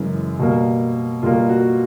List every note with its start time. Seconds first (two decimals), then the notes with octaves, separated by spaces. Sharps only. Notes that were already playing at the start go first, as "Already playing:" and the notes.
Already playing: F#2 C#3 E3 G#3
0.39 B2 G3 A#3
1.23 B2 G3 A#3 F4
1.49 F#4